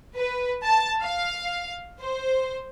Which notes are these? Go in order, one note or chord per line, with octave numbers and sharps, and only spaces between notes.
B4
A5
F5
C5